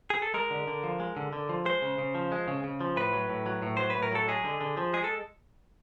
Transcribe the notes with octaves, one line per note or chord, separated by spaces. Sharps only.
G#4
A4
G#3 A#4
D3
D3
F3
G#3
D3
D3
F3
G#3 C5
C#3
C#3
F3
G#3
C#3
C#3
F3
A2 B4
F#3
A2
F#3
A2
F#3 C5
B4
A2
A#4
F#3 A4
G#3 G#4
D3
D3
F3
G#3 G#4
A4